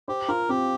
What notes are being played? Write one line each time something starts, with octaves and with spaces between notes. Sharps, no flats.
G4 C5
F4 A#4
C4 G4